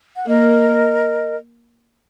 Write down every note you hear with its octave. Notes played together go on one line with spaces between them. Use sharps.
F#5
A#3 A#4 D#5